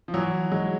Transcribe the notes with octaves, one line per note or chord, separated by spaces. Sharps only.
F3
E3 F#3
F#3 G#3